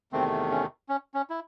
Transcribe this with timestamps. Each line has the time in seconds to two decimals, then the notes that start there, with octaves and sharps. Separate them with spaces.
0.13 E2 C3 D#3 A3 C4
0.51 C#4
0.89 C#4
1.14 C#4
1.30 E4